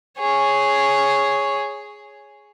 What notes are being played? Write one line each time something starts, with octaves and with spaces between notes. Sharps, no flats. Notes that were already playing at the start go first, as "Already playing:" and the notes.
G#4 C#5